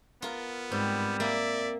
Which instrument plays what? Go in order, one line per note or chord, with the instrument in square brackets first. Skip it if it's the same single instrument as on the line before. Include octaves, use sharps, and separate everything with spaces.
[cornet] B3 [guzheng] F4 A#4
[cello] G#2 [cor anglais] G3 [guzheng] C4
[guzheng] A#3 [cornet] D5 [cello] E5